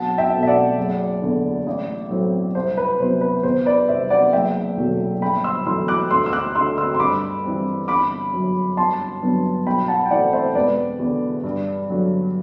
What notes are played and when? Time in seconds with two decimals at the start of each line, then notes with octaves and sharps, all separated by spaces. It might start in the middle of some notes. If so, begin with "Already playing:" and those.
Already playing: B1 F#5 A5
0.18 E5 G5
0.33 B2 A3 C4
0.43 E5
0.47 D5 F#5
0.77 F#1
1.22 E2 D3
1.67 A1
2.10 A2 F#3 C4
2.55 C2 C5
2.77 B4
3.00 C3 F#3 B3 C5
3.21 B4
3.43 E2 C5
3.66 B4 D5
3.88 C3 G3 C4 C5 E5
4.10 D5 F#5
4.33 F#1 E5 G5
4.77 E2 B2 F#3 A3
5.22 G1 G5 B5
5.44 C6 E6
5.66 F#2 E3 A3 C6 E6
5.88 D6 F#6
6.11 D2 C6 E6
6.26 E6
6.33 D6 F#6
6.55 D3 A3 C4 C6 E6
6.77 C6 E6
6.95 C6
7.00 G2 B5 D6
7.44 E3 G3 C4
7.88 G1 B5 D6
8.33 F#2 F#3
8.77 G1 A5 C6
9.22 G2 F#3 B3
9.66 B1 G5 B5
9.88 F#5 A5
10.06 G5
10.11 A2 E3 A3 C4 D5 F#5
10.33 C5 E5
10.55 E1 B4 D5
10.99 E2 D3
11.44 G2
11.88 D3 F#3